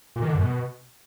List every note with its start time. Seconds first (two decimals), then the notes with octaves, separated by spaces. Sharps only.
0.16 A#2
0.22 D#3
0.28 D3
0.35 F#2
0.41 B2